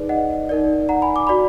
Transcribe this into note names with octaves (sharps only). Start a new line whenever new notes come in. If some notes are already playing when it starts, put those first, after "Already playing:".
Already playing: D#4 G#4 B4 D5
D#5 F#5
D#4 A#4 D5
F#5 A#5
G#5 B5
D6
F#4 D5 B5